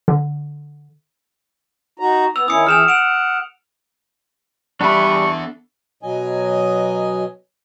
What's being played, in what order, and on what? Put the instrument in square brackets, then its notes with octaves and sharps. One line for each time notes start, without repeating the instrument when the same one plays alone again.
[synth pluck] D3
[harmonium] D#4 F#4 A#5
[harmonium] B3 [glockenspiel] E6 F7
[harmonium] D#3 C#4 E4 [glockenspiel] D#6 C#7
[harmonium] E3 G#4 G5 [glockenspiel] F6 E7 F7
[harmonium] F#5 [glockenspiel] D7 F7
[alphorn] G3 [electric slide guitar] B3 E5 [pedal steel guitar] D4 A4 B5 [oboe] C#6
[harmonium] B2 F#3 D#5 G#5